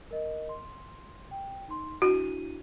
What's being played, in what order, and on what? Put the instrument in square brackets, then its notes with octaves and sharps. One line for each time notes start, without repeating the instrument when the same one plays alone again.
[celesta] A#4 D#5
C6
G5
D#4 C6
[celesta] D4 E4 D#7 [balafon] F#4